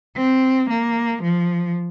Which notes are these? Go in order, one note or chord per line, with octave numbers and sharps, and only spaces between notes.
C4
A#3
F3